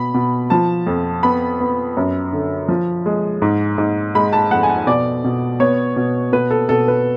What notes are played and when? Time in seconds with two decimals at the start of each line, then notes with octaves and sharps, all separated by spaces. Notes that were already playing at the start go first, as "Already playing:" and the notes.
Already playing: B2 B5
0.14 B2
0.50 F3 A5
0.87 F2
1.23 B3 B5
1.61 B3
1.97 F#2
2.33 D3
2.69 F3
3.06 G#3
3.42 G#2
3.78 G#2
4.15 G#3 B5
4.33 A5
4.51 F2 F#5
4.63 G#5
4.69 F#5
4.87 B2 D5
5.24 B2
5.60 B3 C#5
5.96 B2
6.32 B2 B4
6.51 A4
6.69 B2 A4
6.88 B4